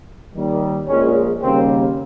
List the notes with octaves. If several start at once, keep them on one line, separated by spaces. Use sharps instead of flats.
D#2 D#3 G3
A#1 A#2 G#3 C#4
D#2 C#3 G3 A#3 C4